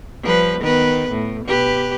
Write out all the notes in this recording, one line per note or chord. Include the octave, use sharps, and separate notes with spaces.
F3 G3 B4
D#3 B3 B4
A2
B2 G4 B4